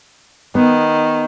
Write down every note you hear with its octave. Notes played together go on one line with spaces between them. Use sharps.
D#3 B3